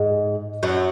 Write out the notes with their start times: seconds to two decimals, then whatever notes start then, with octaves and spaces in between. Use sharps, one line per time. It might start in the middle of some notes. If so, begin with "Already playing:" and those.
Already playing: G#2 G#3
0.63 F#2 F#3